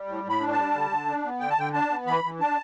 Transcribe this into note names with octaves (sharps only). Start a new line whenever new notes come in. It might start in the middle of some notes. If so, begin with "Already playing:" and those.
Already playing: G3
A2
A2 B5
D4
G3 A5
D3
D3
D4
B3
D3 G5
A5
D3 G5
D4 A5
B3
E3 B5
E3
D4 A5